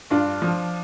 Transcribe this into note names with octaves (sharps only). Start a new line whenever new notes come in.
G2 D4 F4
F3